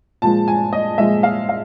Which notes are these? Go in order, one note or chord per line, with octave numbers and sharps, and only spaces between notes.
A#2 F3 G#3 A5
G#5
D#5
A#2 F3 G#3 E5
F5
F5